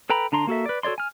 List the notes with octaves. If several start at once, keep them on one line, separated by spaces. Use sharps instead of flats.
A4 B4 G5 A#5 B5
D3 D4 A#5 C6
A#3 F#4 A4 E5
B4 D5
F#4 A4 C#5 D5 C6
G#5 F6